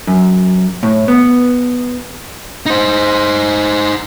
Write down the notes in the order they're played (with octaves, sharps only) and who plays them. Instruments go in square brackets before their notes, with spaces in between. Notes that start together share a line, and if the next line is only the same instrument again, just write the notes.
[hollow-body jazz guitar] F#2
A2
B3
[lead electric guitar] D#4 C5